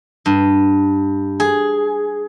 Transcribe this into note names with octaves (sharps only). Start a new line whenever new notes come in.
G2
G#4